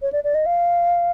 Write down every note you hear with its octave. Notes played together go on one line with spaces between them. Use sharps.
C#5
D5
D5
D#5
F5